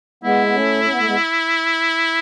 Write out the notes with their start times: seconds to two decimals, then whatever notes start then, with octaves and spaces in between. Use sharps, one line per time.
0.24 G#3 B3 E4
0.46 B3
0.54 A3 C#4
0.84 C#4
0.91 B3
0.99 A3
1.07 G#3 B3